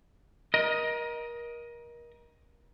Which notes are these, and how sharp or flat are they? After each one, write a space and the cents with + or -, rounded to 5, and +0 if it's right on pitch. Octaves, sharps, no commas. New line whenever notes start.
A#4 +30 D#5 +10